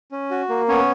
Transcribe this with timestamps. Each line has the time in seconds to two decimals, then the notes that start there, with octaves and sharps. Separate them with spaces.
0.12 C#4
0.31 F#4
0.49 A#3
0.68 B3 C#4 C#5